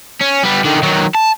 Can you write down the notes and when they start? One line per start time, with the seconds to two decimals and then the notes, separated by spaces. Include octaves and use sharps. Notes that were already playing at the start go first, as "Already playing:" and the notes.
0.21 C#4
0.43 G3 B3
0.64 D3 D#3
0.83 D#3 F#3
1.15 A5